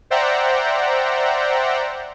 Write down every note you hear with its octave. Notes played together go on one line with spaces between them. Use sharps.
C5 D5 E5 F#5 G5 A#5